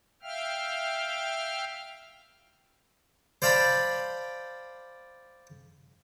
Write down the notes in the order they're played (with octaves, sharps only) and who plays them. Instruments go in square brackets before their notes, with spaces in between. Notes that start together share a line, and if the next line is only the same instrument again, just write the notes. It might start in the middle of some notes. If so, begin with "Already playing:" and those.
[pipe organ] E5 F5 G5 F6
[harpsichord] C5 D5 F5 G5 A5 B5